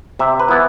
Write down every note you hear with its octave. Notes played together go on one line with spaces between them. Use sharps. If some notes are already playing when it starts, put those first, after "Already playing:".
C3 E5
B4
E3 B3 E4